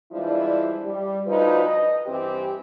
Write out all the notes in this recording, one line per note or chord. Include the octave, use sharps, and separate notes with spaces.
E3 F3 G3 G#3 D4 E4
G3
D2 F3 G3 D#4 B4
D#5
G2 E3 C4 G4